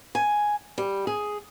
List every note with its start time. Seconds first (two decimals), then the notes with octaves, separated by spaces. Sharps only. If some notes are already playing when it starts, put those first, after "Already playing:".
0.15 G#5
0.78 G3
1.07 G#4